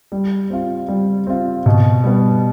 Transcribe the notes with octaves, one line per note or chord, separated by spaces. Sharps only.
G3
C4 F4
G3
C4 F4
B2
G3 B3